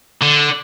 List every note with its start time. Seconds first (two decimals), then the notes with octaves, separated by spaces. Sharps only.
0.22 D3